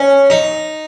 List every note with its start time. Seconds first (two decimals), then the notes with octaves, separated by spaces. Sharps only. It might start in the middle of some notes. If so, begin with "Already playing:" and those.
Already playing: C#4
0.30 D#4